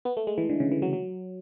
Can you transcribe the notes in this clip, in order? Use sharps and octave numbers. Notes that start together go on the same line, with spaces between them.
B3
A3
G#3
E3
D3
C#3
E3
F#3
F#3